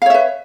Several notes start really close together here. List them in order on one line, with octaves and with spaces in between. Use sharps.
F5 C#5 E5 B4